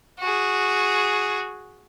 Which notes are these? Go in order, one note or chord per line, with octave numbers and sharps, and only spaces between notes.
F#4 G#4